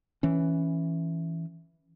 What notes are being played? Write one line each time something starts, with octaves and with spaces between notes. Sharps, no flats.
E3 C#4